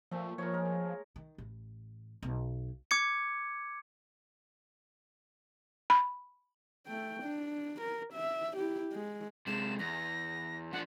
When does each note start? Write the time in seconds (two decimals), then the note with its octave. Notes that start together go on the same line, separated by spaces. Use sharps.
0.11 A#2 F3 A3 E5
0.38 F3 A#4 C#5
0.52 G#3 A#4
1.16 D#3
1.38 A1
2.23 B1
2.91 D6 G#6 C#7
5.90 B5
6.87 A3 G5
7.23 D4
7.81 A#4
8.13 E5
8.57 E4 G4
8.93 G#3
9.47 C3 G#3 E7
9.79 E2 A#6
10.73 F3 D4 F#5